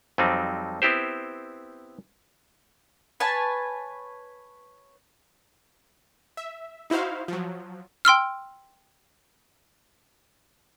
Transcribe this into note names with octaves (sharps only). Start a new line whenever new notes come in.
F2 F#3 G3 C4 D#4
B3 C4 E4 G4 C5
B4 C#5 G#5 A5
E5
D#4 E4 F#4 C5 F5
F3 F#3
G5 C6 E6 F6